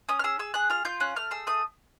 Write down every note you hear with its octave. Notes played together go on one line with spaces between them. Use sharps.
C#4 D#6
F6
G#4 E6
G#4 E6
G#4 F#6
F4 F6
F4 G6
C#4 F#6
A3 F6
G#4 E6
A3 D#6